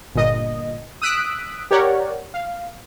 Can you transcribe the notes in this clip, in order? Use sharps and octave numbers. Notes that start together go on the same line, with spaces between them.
G1 A#2 D#5
D#6 E6 F#6 B6 D7
G4 A#4 C#5 D5 F#5
F5